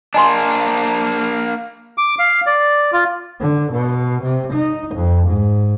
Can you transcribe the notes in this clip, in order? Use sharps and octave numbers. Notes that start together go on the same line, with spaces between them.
A#3 D4 D#5 G#5 C6
D6
F5
D5
F4
D3
B2
C3
D#4
F2
G#2